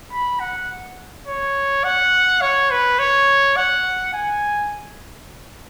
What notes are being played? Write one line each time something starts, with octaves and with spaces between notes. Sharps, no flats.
B5
F#5
C#5
F#5
C#5
B4
C#5
F#5
G#5